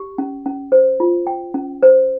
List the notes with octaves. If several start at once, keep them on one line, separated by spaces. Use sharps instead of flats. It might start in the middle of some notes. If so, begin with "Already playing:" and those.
Already playing: G4
C#4
C#4
C5
F4
G5
C#4
C5